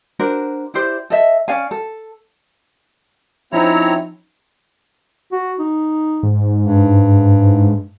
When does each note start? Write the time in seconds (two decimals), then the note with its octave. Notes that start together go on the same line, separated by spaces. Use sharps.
0.19 D4 F#4 A#4 C5
0.74 E4 G4 C5 D5
1.10 A4 D#5 E5
1.48 C#4 D5 F5 G#5
1.71 A4
3.53 F3 C4 C#4 D#4 E4 C#5 A#5
5.32 F#4
5.59 D#4
6.23 G#2
6.62 G2